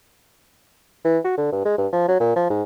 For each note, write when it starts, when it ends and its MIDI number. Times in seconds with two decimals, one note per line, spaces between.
1.05 1.18 52
1.25 1.36 66
1.38 1.48 50
1.52 1.62 43
1.65 1.77 56
1.78 1.88 43
1.93 2.05 53
2.08 2.16 54
2.20 2.32 46
2.36 2.47 53
2.50 2.63 44